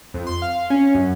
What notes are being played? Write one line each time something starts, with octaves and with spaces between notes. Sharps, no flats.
F2
C6
F5
C#4
F#2